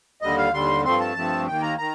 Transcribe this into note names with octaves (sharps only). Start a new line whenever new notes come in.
D#2 D3 G3 D#5
F5
D#2 D3 G3 C6
G2 F3 A3 C4 C6
A5
G2 F3 A3 C4
D#2 D#3 A#3 G5
A#5
D#3 A#5